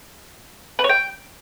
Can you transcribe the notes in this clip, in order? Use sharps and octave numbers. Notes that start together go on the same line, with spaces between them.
B4
C#5
G5